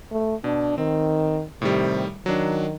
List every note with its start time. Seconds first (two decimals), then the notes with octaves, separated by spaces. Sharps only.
0.11 A3
0.44 B2 D4
0.78 D#3 C4
1.62 A2 C3 D#3 G3
2.26 D#3 F#3 D4